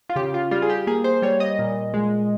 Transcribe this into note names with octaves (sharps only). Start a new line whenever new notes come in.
F4
C#3 G4
F4
G3 F4
G#4
G4
A#3 G#4
C5
G3 C#5
D#5
A#2
G#3